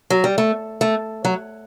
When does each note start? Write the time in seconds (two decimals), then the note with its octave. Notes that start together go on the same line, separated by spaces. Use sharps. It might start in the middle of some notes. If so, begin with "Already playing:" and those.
0.10 F#3
0.24 G3
0.38 A3
0.81 A3
1.25 F#3